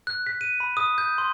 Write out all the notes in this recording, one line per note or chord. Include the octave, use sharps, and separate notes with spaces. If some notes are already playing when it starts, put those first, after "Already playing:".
F#6
B6
D#7
B5
D#6
G6
C6